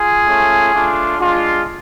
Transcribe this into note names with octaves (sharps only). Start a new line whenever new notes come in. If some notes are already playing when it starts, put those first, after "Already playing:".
Already playing: F4 G#4
A3 C#4 F4
A3 D4 F4
G#3 D4 F4